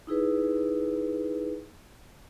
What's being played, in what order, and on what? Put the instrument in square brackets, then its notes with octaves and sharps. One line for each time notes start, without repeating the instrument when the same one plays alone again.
[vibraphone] D#4 E4 G#4 B4